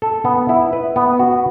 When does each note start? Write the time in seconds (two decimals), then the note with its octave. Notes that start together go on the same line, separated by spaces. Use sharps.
0.02 A4
0.25 B3
0.49 E4
0.73 B4
0.96 B3
1.19 F#4